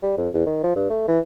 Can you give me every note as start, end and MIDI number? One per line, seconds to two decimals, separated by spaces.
0.03 0.14 55
0.17 0.29 41
0.34 0.44 40
0.46 0.63 51
0.63 0.74 53
0.75 0.89 43
0.90 1.06 57
1.08 1.20 52